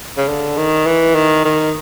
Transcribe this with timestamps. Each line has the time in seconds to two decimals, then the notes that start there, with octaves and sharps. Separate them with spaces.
0.18 C#3
0.28 D3
0.57 D#3
0.87 E3
1.15 D#3
1.45 D#3